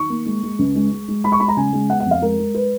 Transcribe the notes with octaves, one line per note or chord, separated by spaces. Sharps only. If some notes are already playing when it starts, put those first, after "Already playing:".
Already playing: D#3 C#6
A#3
G#3
G#3
C#2
G#3
G#3
G#3
G#3 B5
C#6
G#3 B5
A#5
C#3 G#5
G#3
B3 F#5
F#5
F2
F5
G#3 A#4
G#3
B4